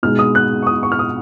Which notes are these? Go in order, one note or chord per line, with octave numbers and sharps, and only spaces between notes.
B2 G#3 D#4 F6
D#6
F#6
C#6
D#6
C#6
F6
D#6